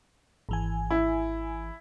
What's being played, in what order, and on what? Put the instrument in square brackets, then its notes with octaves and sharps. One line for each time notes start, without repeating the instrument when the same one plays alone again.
[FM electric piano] G#1 E3 G#5
[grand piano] E4